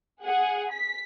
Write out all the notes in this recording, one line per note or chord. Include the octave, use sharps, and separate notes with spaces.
G#4 F#5
B6